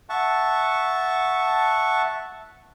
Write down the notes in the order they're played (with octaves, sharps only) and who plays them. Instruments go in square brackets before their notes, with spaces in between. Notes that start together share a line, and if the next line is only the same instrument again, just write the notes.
[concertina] E5 F#5 A5 C#6